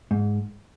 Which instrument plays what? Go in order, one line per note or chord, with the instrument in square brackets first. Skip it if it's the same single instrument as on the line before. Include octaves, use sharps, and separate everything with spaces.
[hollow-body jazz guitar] G#2